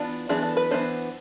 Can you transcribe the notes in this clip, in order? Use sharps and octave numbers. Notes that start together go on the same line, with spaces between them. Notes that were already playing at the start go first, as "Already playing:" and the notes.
Already playing: E3 B3 D4 F4
E3 B3 D4 G#4
A4
B4
E3 B3 D4 C5